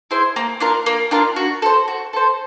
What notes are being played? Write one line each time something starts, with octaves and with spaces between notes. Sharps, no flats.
E4 G#4 C5
A#3
D4 F4 A#4
A#3
D4 F4 A#4
F#4
A4 C5
F#4
A4 C5